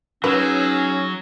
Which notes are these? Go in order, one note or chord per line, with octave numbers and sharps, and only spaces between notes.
F#3 C#4 D#4 G#4 B4 E6